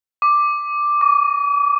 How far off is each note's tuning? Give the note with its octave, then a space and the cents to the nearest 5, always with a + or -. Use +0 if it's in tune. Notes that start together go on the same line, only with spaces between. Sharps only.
D6 +5
D6 -40